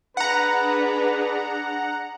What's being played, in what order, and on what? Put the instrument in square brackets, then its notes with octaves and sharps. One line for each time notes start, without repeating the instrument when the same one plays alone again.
[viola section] D4 G#4 [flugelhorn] B4 [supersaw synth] F#5 A#5